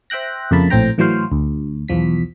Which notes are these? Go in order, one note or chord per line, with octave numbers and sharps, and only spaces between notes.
C5 E5 G5 F#6 A#6
F2 C#3 A3 A#3 A5 B5
A#1 A2 C4 C5 G5 A#5
A2 E3 F#3 F#4 C5 F5
D2
B1 E2 F3 B6